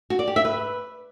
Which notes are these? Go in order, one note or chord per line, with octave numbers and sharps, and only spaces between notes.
F#4
D5
G4
E5
B4